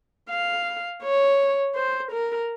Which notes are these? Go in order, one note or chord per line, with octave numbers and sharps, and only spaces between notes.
F5
C#5
C5
A#4